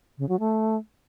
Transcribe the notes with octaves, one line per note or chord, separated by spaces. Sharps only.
C#3
F#3
A3